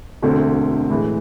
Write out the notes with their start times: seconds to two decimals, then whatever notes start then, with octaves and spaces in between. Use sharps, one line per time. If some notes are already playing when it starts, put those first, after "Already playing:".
0.22 E1 D2 D3 A3 C4
0.90 A2 E3 G#3